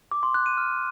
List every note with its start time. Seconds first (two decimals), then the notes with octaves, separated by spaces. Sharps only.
0.11 D6
0.23 C6
0.34 F#6
0.46 D#7
0.57 F6